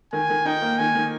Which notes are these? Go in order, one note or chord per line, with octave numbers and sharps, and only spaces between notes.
D#3 G#5
D#3
D#4 G5
A#3
D#3 G#5
D#3